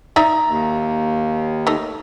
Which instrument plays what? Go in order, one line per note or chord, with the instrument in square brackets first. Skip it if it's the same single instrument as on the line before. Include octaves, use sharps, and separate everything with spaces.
[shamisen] D#4 D5 E5 [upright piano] A#5
[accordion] D#2
[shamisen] A3 D#4